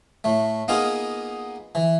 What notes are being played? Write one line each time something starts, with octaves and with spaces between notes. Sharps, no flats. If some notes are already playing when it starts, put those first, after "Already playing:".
A2 A3
A#3 B3 D#4 F4 G#4 A#4
E3